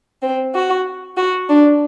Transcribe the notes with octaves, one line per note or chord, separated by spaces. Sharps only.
C4
F#4
F#4
D4